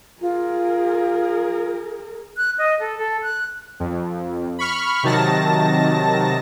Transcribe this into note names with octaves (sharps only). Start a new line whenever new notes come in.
F4 G#4 A#4
F#6
D#5
A4
A4
F#6
F2
B5 C#6 F6
C3 D#3 F#3 A5 A#6